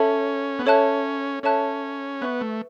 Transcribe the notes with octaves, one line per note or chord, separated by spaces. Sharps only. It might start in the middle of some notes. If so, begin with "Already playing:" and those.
Already playing: C#4 A4 C#5 E5 A5
B3
C#4 A4 C#5 E5 A5 F#6
C#4 A4 C#5 E5 A5 F#6
B3 B4 E5 C#6 F#6
A3